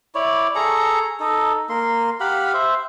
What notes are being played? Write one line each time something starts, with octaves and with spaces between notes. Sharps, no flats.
E4 C#5 D5
G#4 A4 A#5 C#6
D#4 A4
A#3 C6
G4 F5 F#5 B5
C5 E5